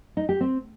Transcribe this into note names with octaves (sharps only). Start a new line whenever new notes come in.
D#4
G4
C4